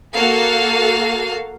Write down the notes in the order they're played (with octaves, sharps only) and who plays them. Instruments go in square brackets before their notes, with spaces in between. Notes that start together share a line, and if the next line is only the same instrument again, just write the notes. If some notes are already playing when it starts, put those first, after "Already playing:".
[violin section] A#3 F#4 A4 F5